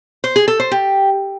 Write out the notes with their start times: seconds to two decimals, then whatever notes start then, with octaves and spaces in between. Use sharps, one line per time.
0.24 C5
0.36 G#4
0.48 A4
0.60 C5
0.71 G4